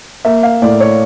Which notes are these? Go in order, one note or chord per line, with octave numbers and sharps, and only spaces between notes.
A#3 E5
F5
A2 D5
C#5